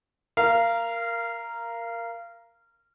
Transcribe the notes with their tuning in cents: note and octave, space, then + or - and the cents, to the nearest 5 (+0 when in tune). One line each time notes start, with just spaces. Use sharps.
A#4 +0 F5 -20